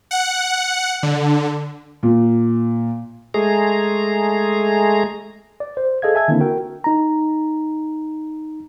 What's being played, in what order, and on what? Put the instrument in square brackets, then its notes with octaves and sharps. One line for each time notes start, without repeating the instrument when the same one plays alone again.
[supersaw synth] F#5
D3
[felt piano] A#2
[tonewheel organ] G#3 A3 G#4 A#5
[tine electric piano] D5
C5
G#4 A4 D#5 F5 G#6
E5 G#5 A5 E6 G#6
D3 D#3 A#3 C4 D4 E4
F#4 A#4 G5
[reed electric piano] D#4 A#5